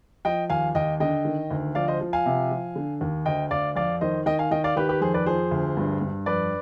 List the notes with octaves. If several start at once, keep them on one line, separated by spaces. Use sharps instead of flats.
F3 D#5 G5
D#2 F5 G#5
D#2 D#5 G5
D3 D#5 G5
D#3
D2
F3 D5 F5
C5 D#5
F3
F5 G#5
C3
F3
D3
D#2
D2 D#5 G5
D2 D5 F5
F2 D5 F5
D#3 C5 D#5
D#3 D#5 G5
F5 G#5
D#3 D#5 G5
D5 F5
D#3 G4 B4
G4 B4
F2 G#4 C5
B4 D5
F3 G#4 C5
D2
G2
G2
F2 B4 D5